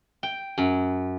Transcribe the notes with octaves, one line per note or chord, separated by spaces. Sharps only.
G5
F#2